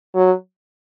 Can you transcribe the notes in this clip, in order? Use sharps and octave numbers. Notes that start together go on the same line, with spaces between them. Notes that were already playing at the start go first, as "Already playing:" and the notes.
F#3